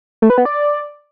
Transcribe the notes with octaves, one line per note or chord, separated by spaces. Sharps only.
A3
B4
B3
D5